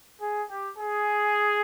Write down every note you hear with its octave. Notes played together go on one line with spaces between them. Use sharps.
G#4
G4
G#4